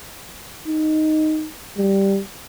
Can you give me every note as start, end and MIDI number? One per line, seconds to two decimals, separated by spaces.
0.68 1.48 63
1.77 2.20 55